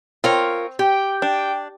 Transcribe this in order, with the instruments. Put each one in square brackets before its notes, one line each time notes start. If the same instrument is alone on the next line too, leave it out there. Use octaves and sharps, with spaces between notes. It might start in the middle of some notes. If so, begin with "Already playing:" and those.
[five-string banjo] C4 [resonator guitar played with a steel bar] F4 A#4 C#5
[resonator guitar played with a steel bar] G4 [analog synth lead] G5
[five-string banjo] D4